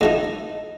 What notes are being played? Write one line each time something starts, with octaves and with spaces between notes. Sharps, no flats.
A2 F3 A3 D#4 D#5